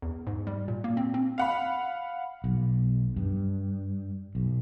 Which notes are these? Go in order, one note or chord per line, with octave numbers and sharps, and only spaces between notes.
E2
G#2
G3
A#2
A#3
C4
C4
F5 F#5 B5
B1
G2
B1